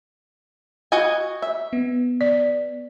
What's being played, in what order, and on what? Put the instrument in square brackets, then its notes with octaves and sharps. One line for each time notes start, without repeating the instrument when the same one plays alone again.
[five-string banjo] F#4 D#5 G#5
E5
[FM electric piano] B3
[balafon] D5